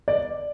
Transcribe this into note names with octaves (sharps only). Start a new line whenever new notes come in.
D5